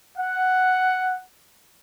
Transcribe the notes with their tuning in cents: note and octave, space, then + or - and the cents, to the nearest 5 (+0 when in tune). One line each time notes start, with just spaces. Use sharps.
F#5 +5